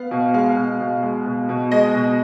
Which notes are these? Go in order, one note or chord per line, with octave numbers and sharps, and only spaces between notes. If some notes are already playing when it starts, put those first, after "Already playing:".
Already playing: B3 F5
B2
G#3 F5
B2
B2
G#3
B2
B2
G#3 D#5
B2